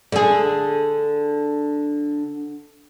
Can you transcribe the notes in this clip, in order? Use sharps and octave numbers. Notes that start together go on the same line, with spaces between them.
D3 G#4